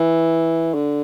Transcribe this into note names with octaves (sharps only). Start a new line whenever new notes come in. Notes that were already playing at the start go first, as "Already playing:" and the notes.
Already playing: E3
D3